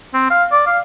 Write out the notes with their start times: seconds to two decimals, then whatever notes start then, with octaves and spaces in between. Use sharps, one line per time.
0.14 C4
0.30 F5
0.52 D5
0.67 F5